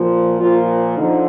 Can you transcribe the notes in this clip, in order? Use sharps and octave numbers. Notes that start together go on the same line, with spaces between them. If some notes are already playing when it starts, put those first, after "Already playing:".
Already playing: A#2 F3
A#2 F3 F4
D3 F3 D#4